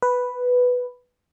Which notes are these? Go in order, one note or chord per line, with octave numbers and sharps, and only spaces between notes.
B4